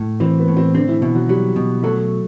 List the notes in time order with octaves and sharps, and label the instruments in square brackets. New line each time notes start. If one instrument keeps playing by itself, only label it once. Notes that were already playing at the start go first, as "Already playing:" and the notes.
Already playing: [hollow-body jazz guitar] A2
[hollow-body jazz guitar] E3 [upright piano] C4
[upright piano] B3
[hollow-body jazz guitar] A2
[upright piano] C4
[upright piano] D3 D4 [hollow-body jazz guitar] C4
[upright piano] E3 E4
[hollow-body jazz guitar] B2 [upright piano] E3 E4
[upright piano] F#3 F#4
[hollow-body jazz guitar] F#3 [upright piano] G3 G4
[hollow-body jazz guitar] B2
[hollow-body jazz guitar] F#3 [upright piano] A3 A4